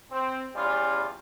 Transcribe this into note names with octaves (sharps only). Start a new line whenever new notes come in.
C4
E2 G3 C#4 F4